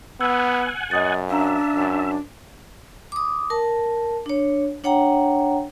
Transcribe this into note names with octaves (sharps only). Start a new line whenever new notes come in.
B3 F#5 G#5 E6
F#2 D#5 D#6 A6
D4 E5 F5 A#5
F#2
D6 D#6
A#4 A5
D4 C#5
D4 C#5 F#5 G5 A#5